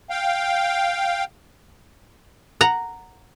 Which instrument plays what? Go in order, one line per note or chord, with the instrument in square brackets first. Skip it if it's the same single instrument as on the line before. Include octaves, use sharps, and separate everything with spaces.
[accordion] F5 G5
[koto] F#5 A#5